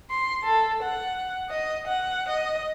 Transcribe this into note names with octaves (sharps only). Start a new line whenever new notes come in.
C6
A4
F#5
D#5
F#5
D#5